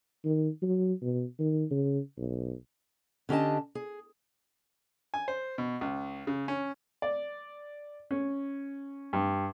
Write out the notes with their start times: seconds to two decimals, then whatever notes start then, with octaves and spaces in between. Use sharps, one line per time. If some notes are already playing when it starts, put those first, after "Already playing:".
0.25 D#3
0.62 F#3
1.02 B2
1.39 D#3
1.71 C#3
2.18 B1
3.29 D3 C#4 G4 D#5 A5
3.75 G#4
5.14 G#5
5.28 C5
5.58 B2
5.81 C#2
6.27 C#3
6.48 C#4
7.02 D5
8.11 C#4
9.13 G2